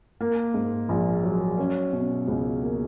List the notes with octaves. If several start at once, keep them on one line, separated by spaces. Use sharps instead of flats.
A#3
G#2
A#1
F#3
C#4
B2
C#2
A#3